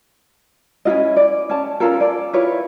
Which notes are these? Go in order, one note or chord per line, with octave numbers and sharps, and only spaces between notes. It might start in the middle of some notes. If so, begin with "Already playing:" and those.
C#4 E4 F4 D#5
D5
C#4 A5
C#4 F4 A4 A#4
D5
E4 F4 B4 C#5